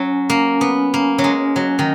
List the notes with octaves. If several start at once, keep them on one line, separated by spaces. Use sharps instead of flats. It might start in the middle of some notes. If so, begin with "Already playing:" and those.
Already playing: F#3 C#4
A#3
B3
A#3
F#3
G#3
F#3
D#3